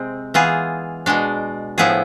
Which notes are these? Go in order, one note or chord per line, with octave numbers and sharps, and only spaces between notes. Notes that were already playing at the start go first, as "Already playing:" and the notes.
Already playing: C3 G#3 C4
E3 B3 F4 G#4
B2 G#3 D4
A2 F3 B3 E4 G#4